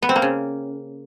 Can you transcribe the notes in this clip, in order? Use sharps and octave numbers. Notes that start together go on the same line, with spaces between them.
B3
C4
A#3
C#3